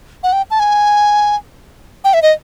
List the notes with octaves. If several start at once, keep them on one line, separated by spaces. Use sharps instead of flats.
F#5
G5
A5
G#5
G5
E5
D#5